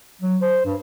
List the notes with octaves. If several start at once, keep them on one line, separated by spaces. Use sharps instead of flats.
F#3
C5
G2